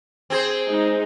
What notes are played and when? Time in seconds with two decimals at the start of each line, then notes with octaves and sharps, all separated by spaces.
0.30 C4 G#4 C5
0.69 G#3 D#4